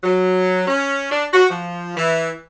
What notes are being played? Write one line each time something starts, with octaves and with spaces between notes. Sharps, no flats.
F#3
C#4
D4
F#4
F3
E3